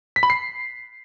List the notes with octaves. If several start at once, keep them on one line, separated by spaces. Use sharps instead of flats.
B6
B5
C7